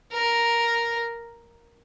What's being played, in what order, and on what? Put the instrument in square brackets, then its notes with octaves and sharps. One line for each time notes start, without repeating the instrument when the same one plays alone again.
[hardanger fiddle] A#4